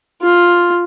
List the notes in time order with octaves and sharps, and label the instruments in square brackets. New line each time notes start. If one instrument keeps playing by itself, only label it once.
[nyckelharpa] F4